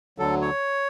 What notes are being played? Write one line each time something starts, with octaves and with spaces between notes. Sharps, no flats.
D2 D3 F#3 A4
C#5